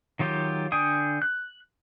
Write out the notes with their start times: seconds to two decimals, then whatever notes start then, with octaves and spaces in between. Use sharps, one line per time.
0.19 D#3 F#3 F4 G4
0.72 D3 D4 G5 G#5 D#6
1.22 F#6